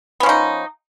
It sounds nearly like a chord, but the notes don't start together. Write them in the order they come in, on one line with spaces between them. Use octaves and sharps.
B3 C#4 F3 D#4